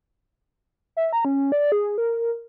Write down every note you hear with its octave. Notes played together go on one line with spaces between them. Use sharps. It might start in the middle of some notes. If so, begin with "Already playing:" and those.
E5
A#5
C#4
D5
G#4
A#4